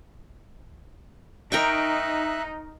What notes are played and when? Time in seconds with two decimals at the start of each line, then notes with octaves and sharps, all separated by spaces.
1.52 D#4 A#4 E5 G5 C#6 F#6